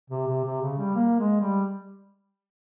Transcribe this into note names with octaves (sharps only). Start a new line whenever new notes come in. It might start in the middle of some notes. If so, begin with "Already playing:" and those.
C3
C3
C3
C#3
G3
A#3
G#3
G3